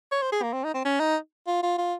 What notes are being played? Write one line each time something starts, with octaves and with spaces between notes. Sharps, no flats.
C#5
C5
G#4
A#3
C4
D#4
C4
C#4
D#4
F4
F4
F4